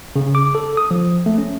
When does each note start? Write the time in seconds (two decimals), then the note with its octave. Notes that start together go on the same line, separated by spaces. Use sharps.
0.16 C#3
0.35 D6
0.55 A4
0.77 D#6
0.91 F3
1.26 A3
1.38 C#4